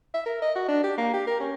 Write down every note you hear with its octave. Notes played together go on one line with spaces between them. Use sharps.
E5
A#4
D#5
F#4
D4
G4
A#3
G4
A#4
C#4